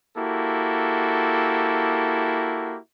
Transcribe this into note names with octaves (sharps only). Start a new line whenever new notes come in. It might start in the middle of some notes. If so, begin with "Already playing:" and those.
A#3 E4 F#4 G4 A4